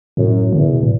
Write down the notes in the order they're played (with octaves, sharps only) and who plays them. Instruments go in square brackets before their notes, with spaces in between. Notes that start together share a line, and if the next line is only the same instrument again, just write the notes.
[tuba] F#2 [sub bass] A2
[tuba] E2 [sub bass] D3
[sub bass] C#3
B2
A2